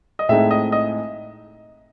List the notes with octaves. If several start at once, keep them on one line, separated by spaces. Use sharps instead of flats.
D#5
A2 G#3 C4 D#4 E5
D#5
D#5